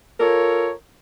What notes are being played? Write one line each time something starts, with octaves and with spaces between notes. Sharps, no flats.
F4 A4 A#4 C#5